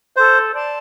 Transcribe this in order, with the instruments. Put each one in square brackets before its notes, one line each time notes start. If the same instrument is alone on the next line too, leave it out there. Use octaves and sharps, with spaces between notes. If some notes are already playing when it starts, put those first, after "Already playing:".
[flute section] A4 [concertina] C5
[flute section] D5 A5 C6